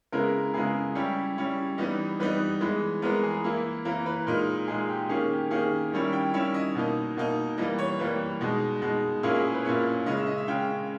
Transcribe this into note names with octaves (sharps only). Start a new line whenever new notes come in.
C#3 G#3 B3 E4 A#4
C#3 G#3 B3 E4 G#4
G3 C#4 E4 G4
G3 C#4 E4
E3 G3 B3 D#4 D#5
E3 G3 B3 D#4 B4
E3 G#3 B3
E3 G#3 B3 A#4
G#4
E3 A#3 E4
E3 A#3 E4 A#4
B4
A#2 G#3 D#4 A#4
A#2 G#3 D#4 G#4
G4
D#3 A#3 C#4 G#4
G4
D#3 A#3 C#4 G#4
D#3 G3 C#4 E4
G5
D#3 G3 C#4 E4 E5
D#5
B2 A#3 D#4
B2 A#3 D#4
E3 G3 A#3 D#5
C#5
E3 G3 A#3 B4
B2 G#3 D#4
B2 G#3 D#4
A#2 A#3 C#4 E4 G#4
G#4
G#4
B4
A#2 A#3 C#4 E4 C#5
C#3 G#3 C#4 D#5
E5
D#5
E5
C#3 G#3 C#4 G5